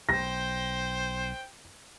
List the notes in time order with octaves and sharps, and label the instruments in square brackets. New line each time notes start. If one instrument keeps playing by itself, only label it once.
[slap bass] B1 [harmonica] C5 G5 [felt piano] A#6